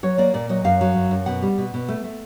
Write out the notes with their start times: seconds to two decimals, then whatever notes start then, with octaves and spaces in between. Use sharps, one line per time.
0.03 F#3 C#5
0.18 A#3 D5
0.34 A#2 D5
0.49 F#3 D#5
0.64 F#2 F5
0.81 F#3
0.96 F#2
1.11 F#2
1.26 B2 F#5
1.42 G3
1.58 B2
1.74 B2
1.88 A3
2.04 A3